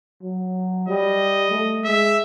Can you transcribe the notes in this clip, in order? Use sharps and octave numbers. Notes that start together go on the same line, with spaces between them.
F#3
G3 D#5
A3
G#3 E5